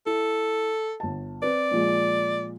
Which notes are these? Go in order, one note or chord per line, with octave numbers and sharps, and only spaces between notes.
E4 A4
G1 A5
C4 B4 D5
A#2 F3 G#3